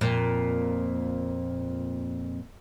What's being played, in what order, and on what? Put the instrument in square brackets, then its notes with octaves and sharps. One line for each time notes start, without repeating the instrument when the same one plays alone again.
[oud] F2 A#2